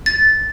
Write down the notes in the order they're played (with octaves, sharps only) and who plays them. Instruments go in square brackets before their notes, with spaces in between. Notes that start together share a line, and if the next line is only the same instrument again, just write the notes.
[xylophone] A6